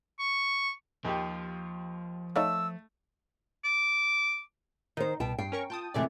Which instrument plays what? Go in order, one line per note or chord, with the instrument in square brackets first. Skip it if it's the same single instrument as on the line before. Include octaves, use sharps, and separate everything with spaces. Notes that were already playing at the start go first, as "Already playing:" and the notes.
[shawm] C#6
[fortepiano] D#2 G4 [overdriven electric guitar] F3
[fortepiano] A3 [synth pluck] D#4 C#5 F5 [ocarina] E6
[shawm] D6
[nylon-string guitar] D#3 C5 [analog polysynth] D#4
[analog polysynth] C2 [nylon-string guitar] B2 G5 A5
[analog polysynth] G2 C7 [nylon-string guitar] G5
[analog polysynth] C#4 A#4 C#6
[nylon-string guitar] F4 [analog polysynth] G5 A5 D#6
[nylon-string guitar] F#2 C3 E3 [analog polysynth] G#3 A3 D5